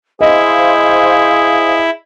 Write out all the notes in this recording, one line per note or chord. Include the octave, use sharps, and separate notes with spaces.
E4 G#4 C5 D#5 F5